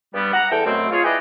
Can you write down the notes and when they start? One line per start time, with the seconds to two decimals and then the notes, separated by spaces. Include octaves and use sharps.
0.13 G2 G3 B3
0.33 F#5 A#5
0.51 E2 A4 E5 G5
0.65 F#2 B2 A3 C4
0.91 F4 G#4 C#5
1.04 E4 G#4 B4 D5 D#5 G5